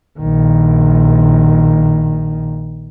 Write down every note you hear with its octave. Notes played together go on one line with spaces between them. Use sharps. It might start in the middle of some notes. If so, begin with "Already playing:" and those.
A#1 D#3